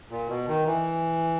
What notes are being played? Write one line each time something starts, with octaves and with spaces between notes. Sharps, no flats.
A#2
B2
D#3
E3